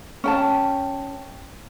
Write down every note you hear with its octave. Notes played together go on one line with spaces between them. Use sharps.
C#4 G5 A5